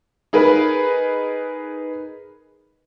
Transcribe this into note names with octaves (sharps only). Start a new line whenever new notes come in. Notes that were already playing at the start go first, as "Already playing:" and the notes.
D#4 G#4 A#4 B4